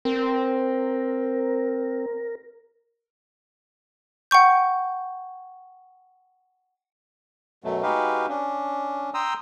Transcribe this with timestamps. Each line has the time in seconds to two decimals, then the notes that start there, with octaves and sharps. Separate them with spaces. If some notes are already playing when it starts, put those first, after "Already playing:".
0.05 C4 A#4
4.31 F#5 G5 C#6 G6
7.64 F#2 B2 F#3 A3
7.83 G#3 D#4 F#4 G4 B4 F5
8.29 C#4 D4
9.14 G5 A#5 C6 D#6 E6